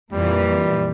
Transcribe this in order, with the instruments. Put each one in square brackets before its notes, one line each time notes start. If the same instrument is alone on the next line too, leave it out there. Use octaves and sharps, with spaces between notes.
[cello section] F2 A#2 E3 [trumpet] G3